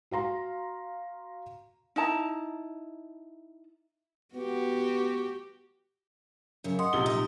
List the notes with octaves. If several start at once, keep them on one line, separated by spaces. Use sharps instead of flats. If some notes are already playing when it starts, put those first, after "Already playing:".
F#4 F5 A#5 C6
D#4 E4 A5 A#5
B3 F#4 G4
F#2 C#3
D#5 F#5 C6 D#6
A#1 C3 G7
D#4